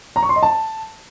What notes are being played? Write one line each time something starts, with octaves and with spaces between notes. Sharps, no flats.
A#5
C#6
C6
D#5
A5